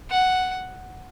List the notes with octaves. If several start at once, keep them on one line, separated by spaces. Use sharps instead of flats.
F#5